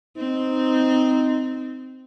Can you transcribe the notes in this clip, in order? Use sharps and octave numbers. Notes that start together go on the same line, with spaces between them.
C4 D#4